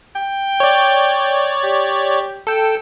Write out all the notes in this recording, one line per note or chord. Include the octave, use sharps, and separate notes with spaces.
G5
C#5 D5
G4
A4 G5